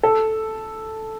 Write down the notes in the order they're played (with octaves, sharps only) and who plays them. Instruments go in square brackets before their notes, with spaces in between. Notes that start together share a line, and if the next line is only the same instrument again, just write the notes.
[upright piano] A4